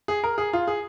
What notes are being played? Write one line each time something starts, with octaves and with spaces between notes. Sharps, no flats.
G#4
A#4
G#4
F4
G#4